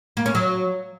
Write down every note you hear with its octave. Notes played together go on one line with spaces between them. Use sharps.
A#3
C#4
F#3